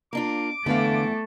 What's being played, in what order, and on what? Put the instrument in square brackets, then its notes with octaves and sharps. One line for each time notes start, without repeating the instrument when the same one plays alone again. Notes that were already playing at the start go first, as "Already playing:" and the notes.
[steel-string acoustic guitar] A#3 D4 F4 [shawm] D6
[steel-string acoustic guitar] E2 [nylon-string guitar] D3 B4 F5 [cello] A3